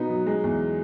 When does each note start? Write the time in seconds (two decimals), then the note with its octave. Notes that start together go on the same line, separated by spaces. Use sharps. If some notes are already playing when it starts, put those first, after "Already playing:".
Already playing: B2 B3 D#4
0.10 F#3
0.26 G#3
0.44 E2